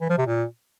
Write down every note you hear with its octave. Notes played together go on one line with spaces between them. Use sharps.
E3
F3
C3
A#2